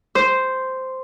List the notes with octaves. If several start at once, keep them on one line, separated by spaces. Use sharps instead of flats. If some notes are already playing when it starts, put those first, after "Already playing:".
C5